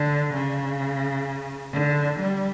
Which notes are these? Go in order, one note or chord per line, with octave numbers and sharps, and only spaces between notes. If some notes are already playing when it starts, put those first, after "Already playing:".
Already playing: D3
C#3
D3
G3